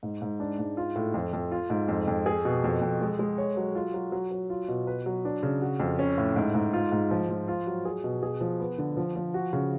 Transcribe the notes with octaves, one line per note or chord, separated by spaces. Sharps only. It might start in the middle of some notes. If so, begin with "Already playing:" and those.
G#2
G#2
D4
G#2
F4
A2
F2
F2
F4
G#2
F2
F2
G#4
B2
F2
F2
G#3
G#3
C#5
F#3
F4
F#3
F#3
F#3
F4
B2
B4
F#3
D4
C#3
F#4
F2
C#4
A2
G#2
G#2
F4
G#2
F3
F3
F4
F#3
G#4
B2
G#4
F3
B3
D3
F3
F3
F#4
C#3